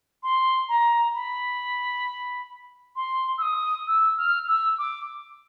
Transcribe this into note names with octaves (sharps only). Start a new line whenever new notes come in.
C6
A#5
B5
C6
E6
D#6
E6
F6
E6
D6